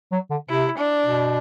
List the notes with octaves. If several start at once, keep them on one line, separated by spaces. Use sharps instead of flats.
F#3
D3
C3 E4
D4
B2